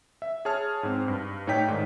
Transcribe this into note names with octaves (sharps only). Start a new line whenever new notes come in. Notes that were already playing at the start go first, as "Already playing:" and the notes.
E5
G#4 C#5 A5 F6
G#2 C4
G2
A2 D#4 C#5 D5 G5 B6
G#2 D#3